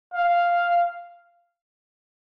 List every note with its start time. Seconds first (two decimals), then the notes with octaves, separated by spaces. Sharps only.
0.14 F5